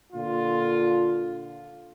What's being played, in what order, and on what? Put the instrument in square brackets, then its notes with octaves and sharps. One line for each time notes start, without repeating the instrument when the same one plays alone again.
[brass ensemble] A#2 D3 F4